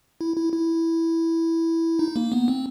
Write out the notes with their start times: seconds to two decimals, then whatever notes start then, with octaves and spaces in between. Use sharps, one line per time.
0.21 E4
0.37 E4
0.54 E4
1.99 D#4
2.16 A#3
2.32 B3
2.48 C4